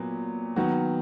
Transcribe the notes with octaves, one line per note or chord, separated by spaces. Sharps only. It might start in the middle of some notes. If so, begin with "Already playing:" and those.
Already playing: A#2 F#3 B3
D#3 F#3 B3 F#4